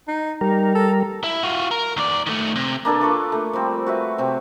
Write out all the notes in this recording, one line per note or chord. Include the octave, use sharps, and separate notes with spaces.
D#4
G3 D#4 A#4
A4
E4
F4 F#4
A#4
D#2 D5
D#3 A3
C3
A#3 D4 A4 B4
F4 B5 C#6 D6
A3 A#3
F3 G3 C4
F#4 B4 E5
C3 C4